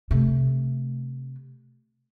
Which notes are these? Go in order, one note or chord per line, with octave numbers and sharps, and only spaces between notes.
C3 A3